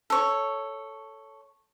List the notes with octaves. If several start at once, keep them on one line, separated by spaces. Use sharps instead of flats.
A4 C#5